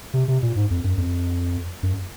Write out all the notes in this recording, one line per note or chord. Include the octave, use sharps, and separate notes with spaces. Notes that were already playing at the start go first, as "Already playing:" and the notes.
C3
C3
A#2
G#2
F2
F#2
F2
F#2